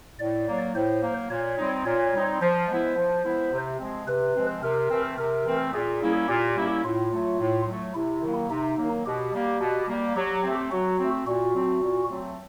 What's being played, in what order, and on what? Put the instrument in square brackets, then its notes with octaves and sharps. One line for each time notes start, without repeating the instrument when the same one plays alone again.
[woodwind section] A2 [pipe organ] D5
[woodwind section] F#3 A#3
[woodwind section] A2 [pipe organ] C5
[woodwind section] F#3 A#3
[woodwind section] A#2 [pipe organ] C#5
[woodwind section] G3 C4 D#4
[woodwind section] A#2 [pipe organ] C#5
[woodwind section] G3 C4 D#4
[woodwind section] F3 [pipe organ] C5
[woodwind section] G#3 B3 E4
F3
G#3 B3 E4
C3
F3 G#3 C4
[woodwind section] C3 [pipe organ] B4
[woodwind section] F3 G#3 C4
[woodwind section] C3 [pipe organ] A#4
[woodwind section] E3 A3 C4
[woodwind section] C3 [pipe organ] A#4
[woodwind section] E3 A3 C4
[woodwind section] A#2 [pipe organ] G#4
[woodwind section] G3 A#3 C#4 E4
[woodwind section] A#2 [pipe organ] G4
[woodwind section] G3 A#3 C#4 E4
[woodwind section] A2 [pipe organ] F4
[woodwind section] F#3 A3
A2
F#3 A3
[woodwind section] C3 [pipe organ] E4
[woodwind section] D#3 F#3 A#3
[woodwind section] C3 [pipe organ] D#4
[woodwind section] D#3 F#3 A#3
[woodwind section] B2 [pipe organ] G4
[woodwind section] G3 A#3
B2
G3 A#3
[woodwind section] F#3 [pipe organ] G4
[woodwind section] A3 C4
[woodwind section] F#3 [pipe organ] F#4
[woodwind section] A3 C4
[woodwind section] A#2 [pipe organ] F#4
[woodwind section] F#3 A3 C4
A#2
F#3 A3 C4